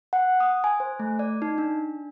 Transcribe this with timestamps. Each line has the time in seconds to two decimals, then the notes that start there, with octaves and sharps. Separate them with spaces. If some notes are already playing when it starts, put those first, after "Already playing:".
0.13 F#5
0.40 D#6
0.64 G#5
0.80 C5
0.99 A3
1.19 D5
1.42 D#4
1.58 D4